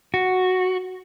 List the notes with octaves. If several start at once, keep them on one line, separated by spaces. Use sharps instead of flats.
F#4